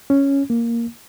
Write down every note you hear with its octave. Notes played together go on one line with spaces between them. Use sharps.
C#4
A#3